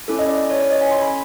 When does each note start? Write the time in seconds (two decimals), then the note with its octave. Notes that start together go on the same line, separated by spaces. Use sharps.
0.08 C#4 E4 A4
0.19 D#5
0.29 D5
0.39 D5
0.50 C#5
0.61 C#5
0.71 D#5
0.81 G#5
0.91 C6
1.02 B5